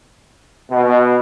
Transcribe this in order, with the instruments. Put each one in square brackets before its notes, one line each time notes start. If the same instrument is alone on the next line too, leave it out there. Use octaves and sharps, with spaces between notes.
[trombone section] B2